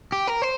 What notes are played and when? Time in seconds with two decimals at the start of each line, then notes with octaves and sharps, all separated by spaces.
0.12 G4
0.27 A#4
0.42 C5